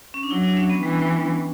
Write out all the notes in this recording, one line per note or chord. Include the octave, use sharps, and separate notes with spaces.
C#4
D4
F#3 E4
D4
C#4
B3
E3 G3